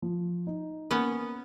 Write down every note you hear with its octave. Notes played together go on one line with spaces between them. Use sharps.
F3
D#4
A#3 B3 C#4